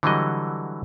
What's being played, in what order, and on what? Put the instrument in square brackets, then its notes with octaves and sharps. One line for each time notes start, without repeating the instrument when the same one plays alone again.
[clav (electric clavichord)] D3 E3 F#3 G3 D#5